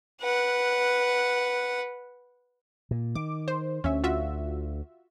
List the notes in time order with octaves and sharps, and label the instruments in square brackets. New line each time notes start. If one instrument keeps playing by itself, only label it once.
[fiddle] B4 F#5
[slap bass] A#2
[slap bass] D#3 [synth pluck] D6
[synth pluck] C5
[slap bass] D2 [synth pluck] C#4 E5
[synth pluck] F4 F#4 E5